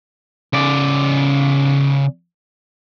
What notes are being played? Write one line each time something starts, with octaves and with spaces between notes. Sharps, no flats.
C#3 D5